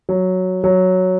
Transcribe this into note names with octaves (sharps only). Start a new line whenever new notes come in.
F#3
F#3